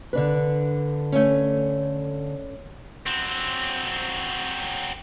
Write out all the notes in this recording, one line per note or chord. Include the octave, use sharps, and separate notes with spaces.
D3 D4 B4
A3 C#4
F#3 C4